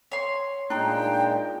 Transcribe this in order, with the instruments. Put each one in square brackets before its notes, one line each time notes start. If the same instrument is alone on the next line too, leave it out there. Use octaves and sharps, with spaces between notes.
[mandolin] C#5 C6
[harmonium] A#2 G#3 [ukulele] D4 D#4 [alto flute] G5